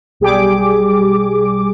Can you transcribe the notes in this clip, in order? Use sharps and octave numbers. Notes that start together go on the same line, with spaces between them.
B1 G3 G4 G#4 D6